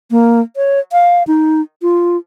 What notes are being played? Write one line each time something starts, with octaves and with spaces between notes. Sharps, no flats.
A#3
C#5
F5
D#4
F4